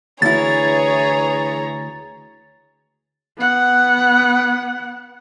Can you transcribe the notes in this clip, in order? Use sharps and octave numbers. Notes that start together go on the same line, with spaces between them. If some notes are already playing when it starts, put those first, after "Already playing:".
D2 E3 E4 G#4 C#5 A#5 A6
B3 F#5